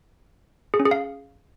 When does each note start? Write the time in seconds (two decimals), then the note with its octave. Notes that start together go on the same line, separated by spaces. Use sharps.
0.74 G#4
0.80 C#4
0.85 G#4
0.91 F5